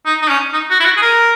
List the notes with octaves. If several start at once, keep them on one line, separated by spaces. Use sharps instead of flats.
D#4
D#4
C#4
D#4
F#4
E4
F#4
G#4
A#4